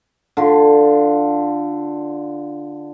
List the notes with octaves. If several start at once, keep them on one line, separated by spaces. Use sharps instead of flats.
D3 F4